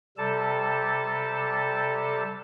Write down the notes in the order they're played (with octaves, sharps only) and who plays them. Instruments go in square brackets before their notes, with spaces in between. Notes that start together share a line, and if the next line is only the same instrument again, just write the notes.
[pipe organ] C3 G3 A4 A5